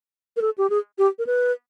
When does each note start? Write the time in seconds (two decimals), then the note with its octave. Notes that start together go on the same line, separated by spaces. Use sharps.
0.37 A#4
0.42 A4
0.58 G4
0.70 G#4
0.98 G4
1.19 A#4
1.27 B4